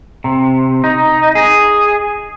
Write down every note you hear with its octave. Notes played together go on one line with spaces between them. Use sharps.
C3
D#4
G#4